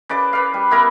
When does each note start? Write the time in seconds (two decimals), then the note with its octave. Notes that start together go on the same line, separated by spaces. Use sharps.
0.09 C#3 B4 D5 D6
0.33 B4 F5
0.54 G3
0.71 B3 E4 A#4 B4